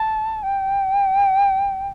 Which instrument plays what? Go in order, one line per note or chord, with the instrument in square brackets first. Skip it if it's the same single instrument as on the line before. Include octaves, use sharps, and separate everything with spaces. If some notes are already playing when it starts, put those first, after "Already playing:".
Already playing: [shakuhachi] A5
G5